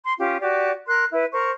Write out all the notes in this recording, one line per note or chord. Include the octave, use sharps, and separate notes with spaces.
C6
C#4 F4 G4
F#4 G4 D5
A#4 C6 F#6
E4 B4
A#4 C5 C#6